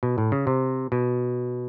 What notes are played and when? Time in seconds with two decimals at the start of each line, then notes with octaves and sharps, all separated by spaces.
0.03 B2
0.18 A2
0.32 C#3
0.47 C3
0.92 B2